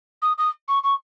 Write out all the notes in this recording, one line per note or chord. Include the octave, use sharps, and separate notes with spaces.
D#6
D#6
C#6
C#6